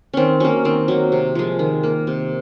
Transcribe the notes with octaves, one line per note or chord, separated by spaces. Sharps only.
D#3 C4 C#4
F#3 A#3 C#4
D#3 C4
F#3 A#3
C3
F3 G#3
D#3
A#3
C3